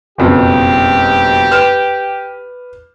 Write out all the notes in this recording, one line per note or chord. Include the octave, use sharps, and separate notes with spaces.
F#1 F2 B2 G4
B4 F6 E7